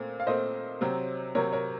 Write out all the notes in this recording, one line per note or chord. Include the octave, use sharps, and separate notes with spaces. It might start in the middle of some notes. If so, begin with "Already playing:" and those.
Already playing: A#2 A3 C4
F5
A#2 A3 C4 C5 D#5
C3 F#3 C4
C3 F#3 C4 A#4 C#5
A#4 C#5